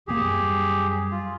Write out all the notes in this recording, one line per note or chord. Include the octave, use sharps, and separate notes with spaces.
E1 A1 A#3 G4 G#4
F#2 G3
F4